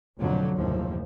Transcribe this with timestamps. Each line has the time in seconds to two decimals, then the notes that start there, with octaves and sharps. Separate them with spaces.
0.17 F1 F2 B2 D3 F#3
0.55 F#1 D#2 A2 C3 F3